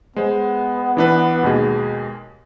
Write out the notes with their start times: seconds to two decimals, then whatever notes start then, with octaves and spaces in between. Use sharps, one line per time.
0.16 G#3 B3 C5
0.97 E3 D4 B4
1.43 D#2 B2 G#3